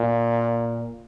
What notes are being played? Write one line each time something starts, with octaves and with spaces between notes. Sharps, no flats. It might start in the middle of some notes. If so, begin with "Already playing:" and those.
Already playing: A#2